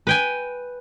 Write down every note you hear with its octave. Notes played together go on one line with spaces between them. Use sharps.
B4 G5 G#5